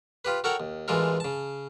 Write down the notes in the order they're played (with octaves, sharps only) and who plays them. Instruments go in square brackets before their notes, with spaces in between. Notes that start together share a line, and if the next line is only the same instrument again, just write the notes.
[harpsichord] F4 G4 B4
F#4 A4 A#4 C#5 F#5 G5
D#2
A1 E3 G#3 F4 A4 A#4
C#3 A5